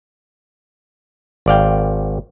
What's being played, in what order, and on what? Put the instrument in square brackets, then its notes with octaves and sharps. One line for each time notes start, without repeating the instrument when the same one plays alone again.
[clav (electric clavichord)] G#1 D5 F5 G5